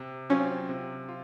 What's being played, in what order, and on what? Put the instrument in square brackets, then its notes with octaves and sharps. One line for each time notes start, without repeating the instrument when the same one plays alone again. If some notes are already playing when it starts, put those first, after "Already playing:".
Already playing: [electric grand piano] C3
[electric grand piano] F#3 C4 F4 [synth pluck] C#4
[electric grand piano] C3
F4